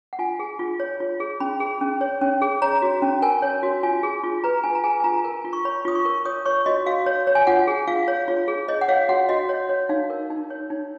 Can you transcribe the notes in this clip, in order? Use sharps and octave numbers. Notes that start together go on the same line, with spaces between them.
F#5
F4 G#5
G#4
F4
C#5
F4
G#4
C#4 B5
G#4
C#4
C#5
C#4
G#4
C#5 A#5
F#4
C#4
A#4 G#5
C#5
F#4
F4 G#5
G#4
F4
B4 A#5
F4 G#5
A#5
G#4 G#5
G#5
F4 A#5
A#4
F4
C#6
C#5 B5
F4 D#6
C#6
A#4
C#5 D#6
C#5 C#6
F#4 D#5
F#4 F5
C#5
C#5
G#5
F4 F#5
G#4
F4 F5
C#5
F4
G#4
C#5 D#5
F#5
C#5 F5
F#4 F#5
F#4 D#5
C#5
C#5
D#4 F5
A#4
D#4
C#5
D#4